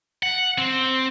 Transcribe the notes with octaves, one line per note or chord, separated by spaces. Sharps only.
F#5
C4